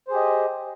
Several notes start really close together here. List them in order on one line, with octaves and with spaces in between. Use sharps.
C5 G#4 G4 D#5